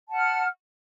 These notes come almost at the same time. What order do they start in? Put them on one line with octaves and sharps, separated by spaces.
A5 F#5 F6